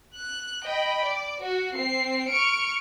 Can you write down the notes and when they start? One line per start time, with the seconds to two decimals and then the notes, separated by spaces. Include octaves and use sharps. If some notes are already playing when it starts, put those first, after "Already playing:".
0.15 F#6
0.64 D#5 G5 B5
1.05 D5
1.41 F#4
1.77 C4 C7
2.30 C#6 F6 C#7 D7